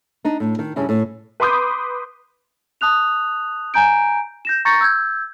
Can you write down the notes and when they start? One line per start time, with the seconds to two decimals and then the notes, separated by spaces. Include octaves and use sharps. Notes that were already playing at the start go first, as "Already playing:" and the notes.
0.25 D4 D#4
0.40 A2
0.59 D#3
0.76 G2 C#3 C#4 E4
0.89 A2
1.40 B4 B5 C6 D6 D#6 G6
2.81 A5 D#6 F#6 F7
3.74 G#5 A#5 G6 D7
4.45 G6 A#6 E7
4.65 A#5 C#6 G6 A6 A#6 C#7
4.81 E6 G6 G#6